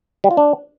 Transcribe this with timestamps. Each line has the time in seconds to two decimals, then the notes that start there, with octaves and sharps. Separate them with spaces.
0.24 G3
0.31 F4
0.37 D4